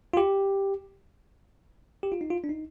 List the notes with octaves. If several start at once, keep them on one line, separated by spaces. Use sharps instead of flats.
F4
G4
G4
F4
D#4
F4
D4
D#4